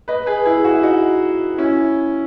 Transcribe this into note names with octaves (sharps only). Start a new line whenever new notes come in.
B4 D#5
G#4 B4
E4 G#4
F#4
E4
D#4 F#4
C#4 E4